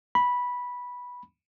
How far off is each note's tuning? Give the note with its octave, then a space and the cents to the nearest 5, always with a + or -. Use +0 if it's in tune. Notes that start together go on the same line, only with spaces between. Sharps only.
B5 -10